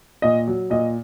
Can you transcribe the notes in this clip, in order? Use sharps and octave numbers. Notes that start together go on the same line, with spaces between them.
A#2 D#5
F#3
A#2 D#5